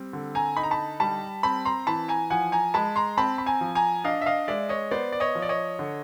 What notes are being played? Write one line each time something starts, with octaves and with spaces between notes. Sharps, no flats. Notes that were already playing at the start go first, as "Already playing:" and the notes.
Already playing: G3 C4
D3
G#5 A#5
D#4 B5
A#5
A5 B5
G3 A5 B5
C4 A5 B5
A#5 C6
E3 A5 B5
G#5 A#5
F3 F#5 G#5
G#5 A#5
G#3 A5 B5
A#5 C6
C4 A5 B5
B5
G#5 A#5
F3
G#5 A#5
D4 D#5 F5
E5
D#5 F5
G#3 D5 E5
C#5 D#5
B3 C5 D5
D5
C#5 D#5
F3
D5
C#5 D#5
D3